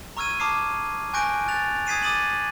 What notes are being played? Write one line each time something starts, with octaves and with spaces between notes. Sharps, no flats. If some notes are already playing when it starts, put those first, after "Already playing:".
A#5 C#6 E6 F6 G#6 D#7
A5 A#5 D6 D#6 F6 C7
G#5 C#6 F#6 G6 A#6 D7
F#6 A6 F7
D#6 G#6 B6 C7 D#7
D6 D#6 A6 D#7 F#7